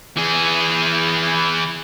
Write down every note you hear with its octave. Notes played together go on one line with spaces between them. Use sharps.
E3 G#4